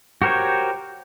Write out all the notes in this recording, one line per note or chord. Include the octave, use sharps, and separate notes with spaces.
F#4 G4 A#4 C5 C#5